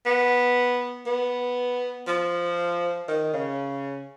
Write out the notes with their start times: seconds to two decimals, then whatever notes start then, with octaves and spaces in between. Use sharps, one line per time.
0.06 B3
1.06 B3
2.07 F3
3.08 D#3
3.33 C#3